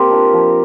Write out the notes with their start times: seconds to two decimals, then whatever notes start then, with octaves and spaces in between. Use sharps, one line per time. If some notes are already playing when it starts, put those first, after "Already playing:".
Already playing: A#3 C4 G4 A#4
0.10 D4 F4
0.33 F3